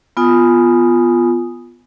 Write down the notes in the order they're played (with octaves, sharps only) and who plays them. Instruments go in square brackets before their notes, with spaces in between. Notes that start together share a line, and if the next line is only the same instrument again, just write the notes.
[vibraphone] B3 F4 G#5 D#6